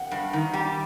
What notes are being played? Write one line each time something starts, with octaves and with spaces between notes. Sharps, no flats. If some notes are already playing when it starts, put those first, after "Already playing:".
Already playing: F#5 G5
G2
D#3 F#5
G3 G5